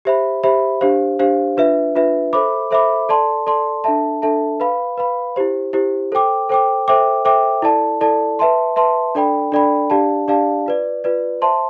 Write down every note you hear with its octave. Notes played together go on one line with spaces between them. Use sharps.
G4 C5 E5 B5
G4 C5 E5 B5
D4 G4 C5 F5
D4 G4 C5 F5
D4 F4 B4 E5
D4 F4 B4 E5
A4 C5 E5 B5 D6
A4 C5 E5 B5 D6
A4 D5 A5 C6
A4 D5 A5 C6
D4 A4 E5 A5
D4 A4 E5 A5
B4 F5 B5
B4 F5 B5
E4 G4 C5
E4 G4 C5
A4 C5 G5 D6
A4 C5 G5 D6
A4 C5 E5 G5 D6
A4 C5 E5 G5 D6
E4 A4 D5 A5
E4 A4 D5 A5
B4 E5 A5 C6
B4 E5 A5 C6
D4 A4 D5 G5 B5
D4 A4 D5 G5 B5
D4 G4 D5 F5 A5
D4 G4 D5 F5 A5
F4 B4 D5
F4 B4 D5
C5 E5 A5 C6